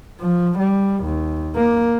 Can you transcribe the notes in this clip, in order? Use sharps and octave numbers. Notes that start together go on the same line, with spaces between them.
F3
G3
D#2
A#3